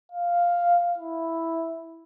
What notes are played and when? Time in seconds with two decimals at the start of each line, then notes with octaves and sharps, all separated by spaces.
0.12 F5
0.98 E4